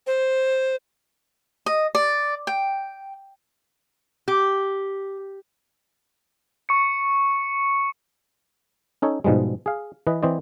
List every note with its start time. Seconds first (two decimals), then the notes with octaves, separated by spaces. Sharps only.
0.07 C5
1.66 D#5
1.95 D5
2.47 G5
4.28 G4
6.69 C#6 C#7
9.02 C#4 D#4 A4 C#5
9.24 G#2 B2 F3 G3 G#3
9.66 G#4 F5
10.07 E3 B4 D#5
10.23 E3 C4 C5 D5 D#5